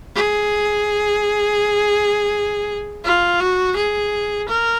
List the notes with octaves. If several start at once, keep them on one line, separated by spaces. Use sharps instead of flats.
G#4
F4
F#4
G#4
A#4